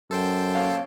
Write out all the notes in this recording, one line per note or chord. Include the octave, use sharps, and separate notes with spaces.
F#2 A4 C5 G5
A#2 C#4 F5